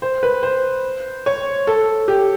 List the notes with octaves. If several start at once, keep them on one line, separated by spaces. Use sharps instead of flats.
C5
B4
C5
C#5
A4
G4